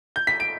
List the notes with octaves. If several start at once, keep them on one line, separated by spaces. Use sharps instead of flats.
G6
B6
D7